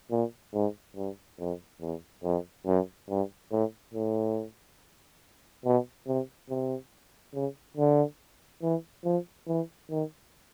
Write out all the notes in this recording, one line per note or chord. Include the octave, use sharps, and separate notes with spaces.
A#2
G#2
G2
F2
E2
F2
F#2
G2
A2
A2
B2
C3
C3
C#3
D3
E3
F3
E3
D#3